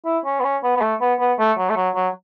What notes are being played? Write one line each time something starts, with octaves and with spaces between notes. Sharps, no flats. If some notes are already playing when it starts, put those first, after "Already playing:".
E4
C#4
B3
C#4
B3
B3
A3
B3
B3
A3
F#3
A3
F#3
F#3